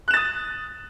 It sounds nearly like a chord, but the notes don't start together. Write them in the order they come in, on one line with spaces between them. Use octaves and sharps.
F#6 E7 A6 D#6